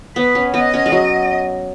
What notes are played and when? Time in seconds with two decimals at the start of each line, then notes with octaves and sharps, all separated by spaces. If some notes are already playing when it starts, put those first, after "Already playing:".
0.16 B3 B4
0.35 C#4
0.54 B3 D#5
0.74 C#4
0.86 G#3
0.92 F#3